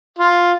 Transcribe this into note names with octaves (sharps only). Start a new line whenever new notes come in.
F4